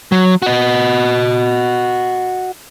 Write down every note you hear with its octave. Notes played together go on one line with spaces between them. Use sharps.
F#3
F#4 D#5